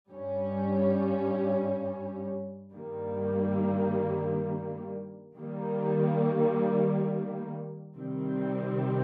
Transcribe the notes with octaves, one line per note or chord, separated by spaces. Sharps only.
G2 G3 C#4
G2 D#3 G3 A#3
D#3 G3 A#3
C3 D#3 G3 C4